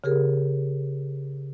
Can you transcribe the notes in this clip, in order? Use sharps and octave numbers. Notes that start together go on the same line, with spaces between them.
C#3 G4 G#4 A#4